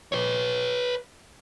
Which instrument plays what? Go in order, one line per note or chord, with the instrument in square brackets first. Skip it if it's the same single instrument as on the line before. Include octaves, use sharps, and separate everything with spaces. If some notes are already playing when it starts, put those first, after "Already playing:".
[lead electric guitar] B4 C#5